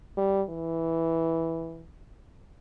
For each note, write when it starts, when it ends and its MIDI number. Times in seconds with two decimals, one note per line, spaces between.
0.17 0.43 55
0.49 1.88 52